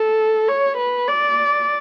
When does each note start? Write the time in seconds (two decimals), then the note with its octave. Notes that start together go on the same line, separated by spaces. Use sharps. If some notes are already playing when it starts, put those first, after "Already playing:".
Already playing: A4
0.48 C#5
0.77 B4
1.08 D5